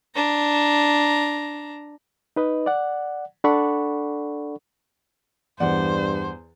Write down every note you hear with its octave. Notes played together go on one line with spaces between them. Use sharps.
D4 A#5
D#4 B4 D#5
D5 F#5
D4 A4 D5 F#5 B5 C#6
E2 G2 C5 D5 F#5